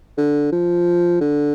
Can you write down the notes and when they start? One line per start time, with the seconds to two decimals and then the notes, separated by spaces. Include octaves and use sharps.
0.18 D3
0.52 F3
1.21 D3